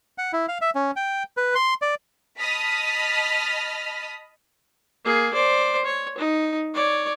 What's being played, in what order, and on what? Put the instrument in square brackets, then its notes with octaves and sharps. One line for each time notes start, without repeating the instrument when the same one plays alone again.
[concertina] F#5
E4
F5
E5
C#4
G5
B4
C6
D5
[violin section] D#5 A5 B5 D#6 F6 B6
[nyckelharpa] A#3 G#4
C5 D5
C#5
D#4
C#5 D5